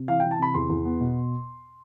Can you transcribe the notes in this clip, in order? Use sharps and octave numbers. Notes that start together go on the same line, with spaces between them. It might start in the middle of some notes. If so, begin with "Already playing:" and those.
Already playing: C3
E3 F5
E3 G5
A5
C3 B5
E2 C6
E2
B3
B2